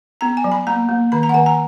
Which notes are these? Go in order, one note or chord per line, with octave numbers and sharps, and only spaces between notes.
B3 A#5
G#5
F#3
B5
A#3 A#5
A#3
D#3 B5
A#5
F#5
D#3 G#5
A#5